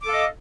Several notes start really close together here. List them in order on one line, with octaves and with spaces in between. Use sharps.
D6 A4 F5 D#5